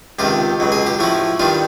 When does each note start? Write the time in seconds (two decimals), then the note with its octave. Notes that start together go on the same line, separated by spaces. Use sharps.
0.19 C#2 C3 D#3 F4 G4
0.60 C#2 B2 F#3
0.72 G#4
0.86 G4
0.99 A2 F3 E4 F#4
1.39 G2 D#3 G3 D#4 F4